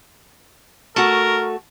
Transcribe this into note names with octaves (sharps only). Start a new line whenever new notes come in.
A3 F#4 A#4